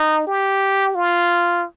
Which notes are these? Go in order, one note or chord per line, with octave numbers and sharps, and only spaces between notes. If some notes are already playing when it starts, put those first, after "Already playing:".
Already playing: D#4
G4
F4